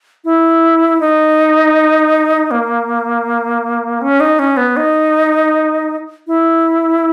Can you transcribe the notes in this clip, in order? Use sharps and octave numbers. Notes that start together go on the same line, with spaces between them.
E4
D#4
A#3
C#4
D#4
C#4
B3
D#4
E4